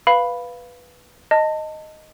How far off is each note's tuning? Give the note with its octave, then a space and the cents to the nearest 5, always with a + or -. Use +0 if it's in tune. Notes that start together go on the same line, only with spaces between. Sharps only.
B4 +0 F5 +0 B5 +0
D#5 +0 A5 +25